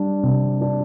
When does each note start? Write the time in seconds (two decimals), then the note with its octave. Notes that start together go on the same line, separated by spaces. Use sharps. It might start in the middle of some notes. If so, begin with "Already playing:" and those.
Already playing: G3 D4
0.23 C3
0.61 D4